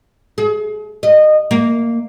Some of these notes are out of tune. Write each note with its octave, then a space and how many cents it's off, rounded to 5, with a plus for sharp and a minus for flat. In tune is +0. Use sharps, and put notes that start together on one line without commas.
G#4 +35
D#5 -20
A#3 -10